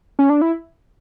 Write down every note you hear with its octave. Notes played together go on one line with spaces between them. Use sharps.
C#4
D4
E4